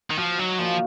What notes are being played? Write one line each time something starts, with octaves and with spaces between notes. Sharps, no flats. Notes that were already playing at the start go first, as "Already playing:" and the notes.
D#3
F3 F#4
F#3 D#4
A#2 F3